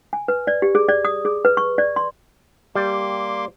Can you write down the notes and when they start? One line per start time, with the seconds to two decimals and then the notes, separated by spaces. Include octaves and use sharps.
0.13 G#5
0.28 B4
0.47 D5
0.62 G4
0.75 G#4
0.89 D5
1.05 D#6
1.25 G#4
1.45 B4
1.57 C#6
1.78 D5
1.96 C6
2.75 G3 A#3 C6 D6